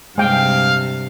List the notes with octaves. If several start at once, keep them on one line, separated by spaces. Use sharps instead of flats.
G2 C3 G#3 F5 G5